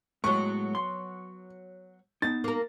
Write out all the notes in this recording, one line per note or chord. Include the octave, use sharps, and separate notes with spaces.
A2 F#3 G#3 B3 C#6
C6
B3 D#4 A6
A#3 A#4